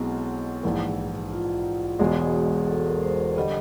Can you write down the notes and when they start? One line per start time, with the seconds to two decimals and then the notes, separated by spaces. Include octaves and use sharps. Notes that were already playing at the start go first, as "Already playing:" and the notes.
Already playing: B1 B2 G#3 C4 E4
0.63 A#1 G#2 E3 E4
1.32 F4
1.99 E1 E2 B2 G#3 G#4
2.68 A4
2.86 A#4
3.03 C5
3.36 D3 G3 D#5